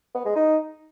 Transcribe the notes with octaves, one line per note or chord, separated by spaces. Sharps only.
B3
G#3
D#4